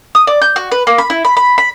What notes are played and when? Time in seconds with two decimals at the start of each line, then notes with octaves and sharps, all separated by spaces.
0.15 D#6
0.27 D5
0.42 G6
0.56 F#4
0.72 B4
0.87 A#3
0.98 B5
1.10 E4
1.25 B5
1.37 B5
1.58 B5